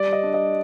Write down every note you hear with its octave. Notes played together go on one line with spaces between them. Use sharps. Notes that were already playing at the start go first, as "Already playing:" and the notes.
Already playing: G3 D5
D#5
D4
D#5